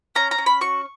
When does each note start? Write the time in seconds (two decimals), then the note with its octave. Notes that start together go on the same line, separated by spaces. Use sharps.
0.15 C#4 A#5
0.31 A#5
0.38 C#4
0.46 B5
0.61 F#4 C#6